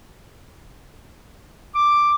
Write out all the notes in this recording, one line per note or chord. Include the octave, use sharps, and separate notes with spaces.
D6